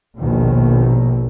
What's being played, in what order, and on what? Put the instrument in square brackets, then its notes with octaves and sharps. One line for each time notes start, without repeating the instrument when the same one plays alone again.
[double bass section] A#1 D#2 B2 D#3